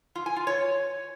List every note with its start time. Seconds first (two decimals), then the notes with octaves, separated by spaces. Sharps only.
0.15 F4
0.26 G#5
0.36 F4
0.47 C#5